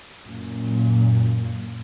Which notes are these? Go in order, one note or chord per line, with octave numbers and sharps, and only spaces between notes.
F#2 A#2